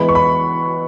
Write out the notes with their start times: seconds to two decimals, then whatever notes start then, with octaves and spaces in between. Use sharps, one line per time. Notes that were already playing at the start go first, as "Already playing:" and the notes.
Already playing: E3 G#3 B3 B5
0.09 C#6
0.15 B5